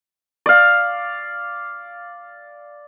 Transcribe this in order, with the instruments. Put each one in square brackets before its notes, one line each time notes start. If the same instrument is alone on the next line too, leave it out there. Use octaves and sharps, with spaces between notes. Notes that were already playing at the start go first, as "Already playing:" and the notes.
[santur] D5 F5